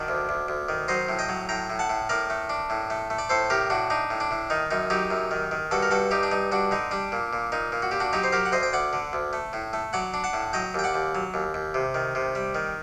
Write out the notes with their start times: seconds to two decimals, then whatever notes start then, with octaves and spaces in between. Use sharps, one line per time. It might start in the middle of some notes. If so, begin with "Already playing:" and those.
Already playing: D#3 D4 F#4
0.08 D2
0.29 D2
0.48 D2
0.69 D#3
0.88 F#3 C5 D#5
1.09 A2
1.19 D#5 G5
1.29 F#3
1.49 A2 G5 A#5
1.70 A2
1.79 F#5 A5
1.90 A2
2.09 A2 A#4 D5
2.30 A3
2.49 D4
2.70 A2
2.90 A3
3.10 A3
3.18 D5
3.29 A2 A4 C5
3.50 A2 G4 A#4
3.70 A2 D4 F#4
3.90 D4 D#4
4.10 A2
4.20 D4
4.31 A2
4.50 D#3 D#4
4.71 F#2 D#4
4.90 F#3 D#4 G4
5.11 F#2
5.31 D#3
5.51 D#3
5.71 G2 F#4 A4
5.82 A#4
5.91 G2 F#4 A4
6.11 G2 D#4 G4
6.23 D4
6.31 G2 D#4
6.51 G2 D4 F#4
6.71 D3 D#4
6.91 G3 D4
7.12 A#2
7.33 A#2
7.52 A#2 D#4
7.72 A#2
7.82 F#4
7.91 A#2 G4
8.00 D4 F#4
8.13 F#3 D#4 G4
8.23 C5
8.32 F#3 G4 A#4
8.46 F#5
8.52 D2 C5 D#5
8.63 G5
8.73 D2 D5 F#5
8.93 D3
9.13 D2
9.33 A3
9.53 A2
9.73 A3
9.93 F#3 D5 F#5
10.14 D4
10.24 F#5 A5
10.33 A2
10.53 F#3 D#5 G5
10.74 D#2 G5
10.84 D5 F#5
10.94 D#2
11.15 F#3
11.34 D#2
11.54 D#2
11.74 C3
11.94 D#3
12.15 C3
12.35 G3
12.55 D#3